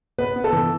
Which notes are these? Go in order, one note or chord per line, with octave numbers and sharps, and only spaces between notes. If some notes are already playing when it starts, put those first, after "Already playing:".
B3 B4
B3
A4
E3